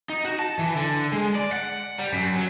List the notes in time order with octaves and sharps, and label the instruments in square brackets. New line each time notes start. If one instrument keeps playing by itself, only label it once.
[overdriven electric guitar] D#4
F#4
A5
E3
D3
G#3
D5
F#5
G3
F#2
F#3